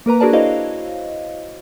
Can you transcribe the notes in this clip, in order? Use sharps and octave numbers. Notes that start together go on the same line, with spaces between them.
A#3 A#4 B4 A#5
D4 F#4 G#4 A#4 D5 A5
E4 F#4 C5 C#5 D#5 F5